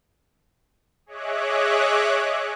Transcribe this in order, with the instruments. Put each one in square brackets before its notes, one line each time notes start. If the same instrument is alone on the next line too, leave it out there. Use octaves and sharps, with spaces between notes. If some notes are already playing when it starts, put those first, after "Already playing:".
[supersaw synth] G#4 C#5 D#5 E5 D6 F#6